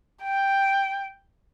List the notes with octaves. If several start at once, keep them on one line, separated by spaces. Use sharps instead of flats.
G5